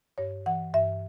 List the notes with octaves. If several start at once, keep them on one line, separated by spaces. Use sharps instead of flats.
G2 C#5
E3 F#5
G2 E5